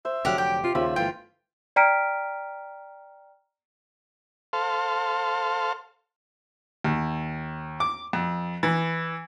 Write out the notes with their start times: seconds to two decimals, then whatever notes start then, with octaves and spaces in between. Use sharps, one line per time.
0.05 C5 E5
0.25 F1 D3 F#3 G4 F5 F#5
0.38 G4 G5
0.64 C3 F4
0.75 D#2 C#3 F4 C5 E5 B5
0.96 G1 E3 A3 F4 F5 G5
1.76 D5 G5 A#5 F6 B6 D7
4.53 A4 C5 F5
6.84 D#2
7.80 D6
8.13 F2
8.63 E3